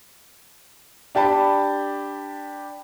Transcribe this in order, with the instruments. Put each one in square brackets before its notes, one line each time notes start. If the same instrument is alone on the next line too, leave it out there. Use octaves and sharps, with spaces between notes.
[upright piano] D4 G4 A5 B5